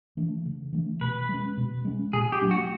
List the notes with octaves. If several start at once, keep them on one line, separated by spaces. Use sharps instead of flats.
E3 A3 D4
C#3
E3 A3 D4
B2 B4
G#3 C#4
B2
G#3 C#4
A#2 G#4
G4
F#3 A3 D4
F#4